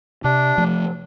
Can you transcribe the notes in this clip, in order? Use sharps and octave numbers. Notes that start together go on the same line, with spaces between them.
C3 D4
F3 A3